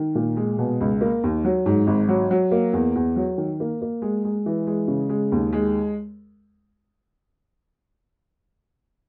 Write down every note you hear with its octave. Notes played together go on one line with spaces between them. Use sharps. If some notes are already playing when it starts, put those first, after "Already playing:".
Already playing: D#3
A#2
G#3
B2
C#2
A#3
D#2
F#3
G#2
G#1
F#3
F#3
A#3
E2
E2
F#3
D#3
A#3
A#3
G#3
G#3
E3
G#3
C#3
G#3
D#2
G#3